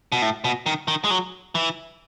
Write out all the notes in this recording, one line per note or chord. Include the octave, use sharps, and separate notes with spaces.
B2
A2
B2
D#3
D#3
G#3
F#3
E3